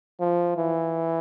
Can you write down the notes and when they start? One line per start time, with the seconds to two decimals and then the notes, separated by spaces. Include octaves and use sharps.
0.20 F3
0.57 E3